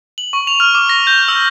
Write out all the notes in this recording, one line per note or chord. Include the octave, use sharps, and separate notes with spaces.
F#7
C#6
F7
F6
D6
A#6
G6
E6